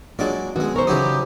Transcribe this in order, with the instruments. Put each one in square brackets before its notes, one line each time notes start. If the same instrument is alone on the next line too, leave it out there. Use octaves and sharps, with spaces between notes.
[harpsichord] F#3 G#3 D5 [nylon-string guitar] A#3 D4 [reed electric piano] F4
[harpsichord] B1 G#3 [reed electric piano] D#3 B3 C#4 [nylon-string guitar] F#4
[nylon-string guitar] A#4 C5 [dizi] C#6
[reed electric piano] C#3 D#6 [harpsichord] E3 F#3 D#4 [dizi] G4